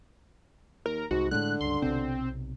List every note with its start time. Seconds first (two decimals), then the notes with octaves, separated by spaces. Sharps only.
0.86 D#2 A#4
1.11 C2 G#2 F#4
1.31 A2 D3 G#3 A3 F#6
1.61 C#2 G2 C6
1.82 B1 C3 C4